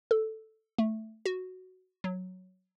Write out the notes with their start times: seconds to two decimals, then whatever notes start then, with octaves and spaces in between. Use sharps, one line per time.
0.11 A4
0.78 A3
1.26 F#4
2.04 F#3